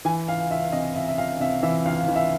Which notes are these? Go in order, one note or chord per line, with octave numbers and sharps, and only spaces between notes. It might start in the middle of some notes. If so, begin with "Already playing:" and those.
E3 G#5
C#2 F5
C#2 E5
C3 D#5
C#2 E5
E5
C#2 F5
C3 E5
E3 E5
C#2 F5
E3
E5